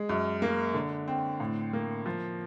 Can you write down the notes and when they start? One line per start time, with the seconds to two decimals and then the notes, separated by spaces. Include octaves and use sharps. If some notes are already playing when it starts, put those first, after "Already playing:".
Already playing: G#3
0.09 F#2
0.42 A#3
0.74 D3
1.08 C4
1.40 A2
1.73 A#3
2.06 F3